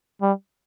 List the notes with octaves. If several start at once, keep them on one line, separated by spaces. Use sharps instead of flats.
G3